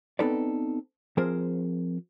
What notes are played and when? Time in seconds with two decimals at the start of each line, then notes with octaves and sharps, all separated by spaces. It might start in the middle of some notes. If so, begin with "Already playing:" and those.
0.19 B3 C4 D#4 A4 B4 D5
1.17 F3 C4 G#4 A#4 C5